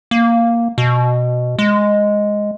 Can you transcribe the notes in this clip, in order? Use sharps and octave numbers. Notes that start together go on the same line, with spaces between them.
A#3
B2
G#3